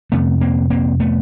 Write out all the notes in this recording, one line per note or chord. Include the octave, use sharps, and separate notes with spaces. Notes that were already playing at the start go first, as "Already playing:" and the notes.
F2 C3 A3 B3
A#3 C4
A#3 C4
A3 B3